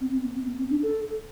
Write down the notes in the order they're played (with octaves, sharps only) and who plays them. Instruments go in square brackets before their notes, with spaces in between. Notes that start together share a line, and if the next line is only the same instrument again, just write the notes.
[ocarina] C4
C4
B3
C4
B3
C4
D4
A4